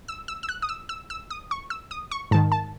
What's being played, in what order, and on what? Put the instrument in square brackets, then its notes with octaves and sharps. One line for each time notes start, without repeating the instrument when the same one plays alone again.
[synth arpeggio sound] E6
E6
E6
F#6
D#6
E6
E6
E6
D#6
C#6
E6
D#6
C#6
G#2 D#3 A5
A5